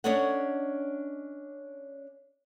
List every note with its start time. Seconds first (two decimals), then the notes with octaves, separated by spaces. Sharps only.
0.04 C#4 D4 A4 C#5 D#5 F#5